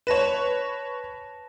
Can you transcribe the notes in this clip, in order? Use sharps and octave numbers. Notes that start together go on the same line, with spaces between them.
B4 C#5 A5 A#6 E7